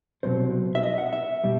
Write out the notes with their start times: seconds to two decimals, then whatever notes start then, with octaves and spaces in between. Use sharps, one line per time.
0.23 C2 B2 F#3 C4 C5
0.75 E5
0.83 D#5
0.98 F#5
1.13 E5
1.44 B2 G3